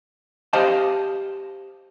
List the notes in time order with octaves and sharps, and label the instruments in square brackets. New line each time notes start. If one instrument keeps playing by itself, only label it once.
[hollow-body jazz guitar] G4 C5 D#5 F5 A5